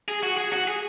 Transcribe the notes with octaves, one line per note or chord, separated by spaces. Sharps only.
G#4
F#4
G#4
F#4
G#4